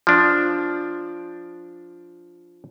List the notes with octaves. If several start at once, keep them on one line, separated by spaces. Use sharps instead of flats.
F3 D4